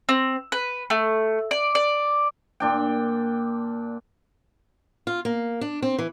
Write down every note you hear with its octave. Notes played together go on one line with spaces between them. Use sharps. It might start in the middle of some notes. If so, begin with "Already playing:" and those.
C4
B4
A3
D5
D5
A#2 D4 G5
F4
A#3
D4
C4
E3